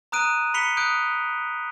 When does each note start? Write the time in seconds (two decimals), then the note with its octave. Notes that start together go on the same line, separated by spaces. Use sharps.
0.12 A#5 D#6 F#6 D7 D#7
0.54 B5 B6 C#7 F7 G7
0.77 D#6 F#6 G6 D7